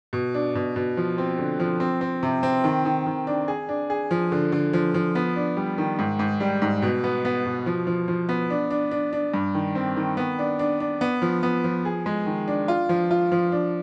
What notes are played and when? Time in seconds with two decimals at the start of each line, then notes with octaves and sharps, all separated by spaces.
0.13 B2
0.34 D4
0.55 B2
0.76 B2
0.97 F3
1.18 C4
1.39 D3
1.60 F3
1.80 C4
2.01 C4
2.23 C3
2.43 C4
2.64 D#3
2.85 D#3
3.06 D#3
3.27 D4
3.48 G#4
3.69 D4
3.90 G#4
4.11 F3
4.32 D3
4.52 D3
4.73 F3
4.94 F3
5.15 B3
5.36 D4
5.57 G3
5.78 D#3
5.99 G#2
6.19 G#2
6.40 G3
6.62 G#2
6.82 B2
7.04 B3
7.25 B3
7.45 B2
7.66 F3
7.87 F3
8.08 F3
8.29 B3
8.50 D4
8.71 D4
8.91 D4
9.13 D4
9.34 G2
9.54 D#3
9.75 C4
9.97 D#3
10.17 B3
10.39 D4
10.59 D4
10.80 D4
11.01 B3
11.22 F3
11.43 B3
11.64 F3
11.85 G#4
12.06 G#3
12.26 D#3
12.48 D4
12.68 F4
12.89 F3
13.11 F4
13.32 F3
13.52 D4